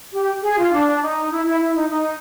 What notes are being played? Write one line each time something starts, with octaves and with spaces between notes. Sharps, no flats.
G4
G#4
F4
D4
D#4
E4
E4
E4
D#4
D#4